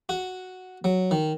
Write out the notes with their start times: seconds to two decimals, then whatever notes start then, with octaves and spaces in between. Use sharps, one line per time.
0.09 F#4
0.84 F#3
1.11 D#3